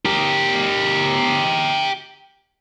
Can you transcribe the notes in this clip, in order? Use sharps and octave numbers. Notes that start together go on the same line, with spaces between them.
G4 A#4